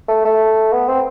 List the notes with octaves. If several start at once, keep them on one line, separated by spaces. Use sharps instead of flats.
A3
A3
B3
C4